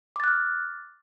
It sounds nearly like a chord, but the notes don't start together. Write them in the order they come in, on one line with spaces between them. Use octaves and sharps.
D6 A6 F#6 F6